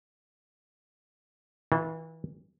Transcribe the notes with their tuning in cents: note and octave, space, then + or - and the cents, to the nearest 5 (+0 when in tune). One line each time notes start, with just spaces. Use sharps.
E3 -30 F4 +0